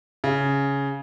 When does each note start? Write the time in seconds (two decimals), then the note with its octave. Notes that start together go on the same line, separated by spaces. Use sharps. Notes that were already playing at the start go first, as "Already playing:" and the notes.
0.24 C#3